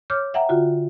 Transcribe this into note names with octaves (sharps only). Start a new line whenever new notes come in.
C#5 D6 F6 G6
E5 F#5 G5 A#5
D3 F4 F#4